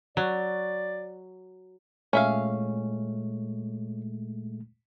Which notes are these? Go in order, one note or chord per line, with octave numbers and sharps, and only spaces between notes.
F#3 D5
A#2 G#3 A3 C#4 E5 F5